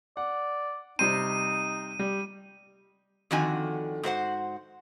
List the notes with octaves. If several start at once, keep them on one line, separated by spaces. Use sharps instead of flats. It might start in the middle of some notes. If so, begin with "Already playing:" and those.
D5 F#5
C3 G3 C4 D#4 D#7
G3
F2 D3 D#3 F#4 G#5
G#2 F#4 C5 F#5